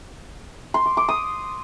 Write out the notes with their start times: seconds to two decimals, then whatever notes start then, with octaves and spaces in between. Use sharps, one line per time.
0.74 C6
0.86 D6
0.97 D6
1.09 D#6